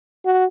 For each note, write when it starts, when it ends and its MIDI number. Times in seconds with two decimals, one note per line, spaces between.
0.25 0.45 66